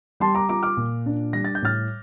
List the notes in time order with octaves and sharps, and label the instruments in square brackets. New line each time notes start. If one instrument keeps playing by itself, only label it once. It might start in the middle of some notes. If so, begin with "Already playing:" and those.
[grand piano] G3 A5 C6
A#5 D6
F4 A#5 D6
D6 F6
A#2
D4
G3 A#6
A6
G6
A2 F6 A6